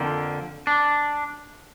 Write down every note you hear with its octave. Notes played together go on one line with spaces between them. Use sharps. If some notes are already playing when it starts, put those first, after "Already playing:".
Already playing: F2 D3 F3 A#3
D4